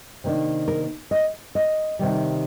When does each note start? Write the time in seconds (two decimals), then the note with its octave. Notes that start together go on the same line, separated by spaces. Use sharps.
0.24 C3 D#3 A#3 D4
0.68 A#4
1.11 D#5
1.55 D#5
1.99 C3 D#3 G3